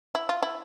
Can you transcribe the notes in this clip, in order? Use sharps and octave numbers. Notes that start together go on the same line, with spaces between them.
E4
F4
E4